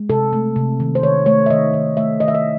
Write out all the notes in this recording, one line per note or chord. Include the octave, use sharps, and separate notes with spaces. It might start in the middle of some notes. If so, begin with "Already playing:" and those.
Already playing: G#3
C3 A4
A3
C3
D#3
C5
D#3 C#5
A3 C#5
E5
D#3 D#5
D#3
A3 E5
D#3 D#5
E5
D#5